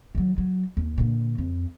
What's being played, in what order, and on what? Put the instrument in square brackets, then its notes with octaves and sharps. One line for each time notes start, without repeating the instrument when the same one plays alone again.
[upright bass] D#3 F#3
F#3
D#2
A#2 D3
F2